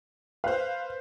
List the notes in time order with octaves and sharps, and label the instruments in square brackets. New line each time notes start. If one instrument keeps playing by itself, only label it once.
[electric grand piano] B4 C5 [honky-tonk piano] F5 F#6